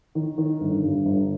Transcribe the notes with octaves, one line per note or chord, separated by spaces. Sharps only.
D#3
D#3
G1
G2
G1